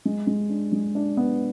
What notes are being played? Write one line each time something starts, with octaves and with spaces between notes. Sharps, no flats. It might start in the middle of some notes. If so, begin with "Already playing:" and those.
G#3
G#3
D4
G#3
D4
B3